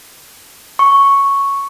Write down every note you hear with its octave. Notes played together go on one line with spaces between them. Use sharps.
C#6